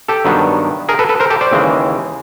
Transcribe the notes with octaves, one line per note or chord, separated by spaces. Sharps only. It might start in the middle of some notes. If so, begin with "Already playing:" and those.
G4 A4
G2 D#3 F#3 B3 D4
G#4 A#4
A4 B4
A4 B4
A#4 C5
G4 A4
C5 D5
D#2 C#3 E3 G#3